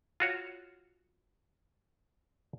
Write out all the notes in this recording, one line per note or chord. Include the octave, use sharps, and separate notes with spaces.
F4 F#4 C#5